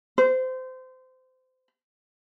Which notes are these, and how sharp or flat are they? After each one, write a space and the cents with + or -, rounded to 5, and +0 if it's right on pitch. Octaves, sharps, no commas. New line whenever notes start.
C5 -25